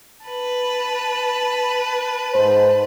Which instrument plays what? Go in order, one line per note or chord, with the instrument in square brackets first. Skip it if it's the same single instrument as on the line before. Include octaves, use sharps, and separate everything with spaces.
[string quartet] B4 A5
[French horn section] G#2 C5